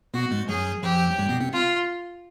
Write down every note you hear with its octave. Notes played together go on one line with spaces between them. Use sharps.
B2 B3 F#4
G#2 G#3
F#2 F#3 G#4
F2 F3 G4
F#3
G2 G3
B2 B3
C3 C4
F4